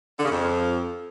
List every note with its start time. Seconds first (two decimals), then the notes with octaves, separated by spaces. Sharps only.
0.19 D3
0.25 C#3
0.31 F2